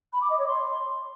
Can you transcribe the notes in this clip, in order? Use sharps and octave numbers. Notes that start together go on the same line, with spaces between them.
B5
D6
D#5
C#5
C6